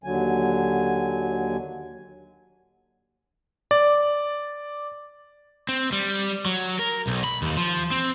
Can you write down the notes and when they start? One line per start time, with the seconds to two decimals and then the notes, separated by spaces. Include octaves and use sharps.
0.04 D#2 D3 F#3 G#5
3.71 D5
5.69 C4
5.92 G3
6.46 F#3
6.79 A#4
7.07 B1
7.24 B5
7.42 D#2
7.57 F3
7.91 C4